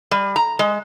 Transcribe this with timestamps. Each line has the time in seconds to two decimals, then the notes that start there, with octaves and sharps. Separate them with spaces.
0.11 G3
0.36 A#5
0.59 G#3